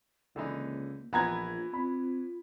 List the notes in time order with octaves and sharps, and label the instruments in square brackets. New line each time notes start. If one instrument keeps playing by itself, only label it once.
[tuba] C#2 [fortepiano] D3 E3 D#4 [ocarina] A#3
[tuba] A#1 [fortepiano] E3 B3 B4 [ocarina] F4 [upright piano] F#5 A#5 G#6
[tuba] C4 [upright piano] B5